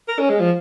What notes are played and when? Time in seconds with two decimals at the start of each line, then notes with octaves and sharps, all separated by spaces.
0.08 A#4
0.19 C#4
0.30 G#3
0.40 F3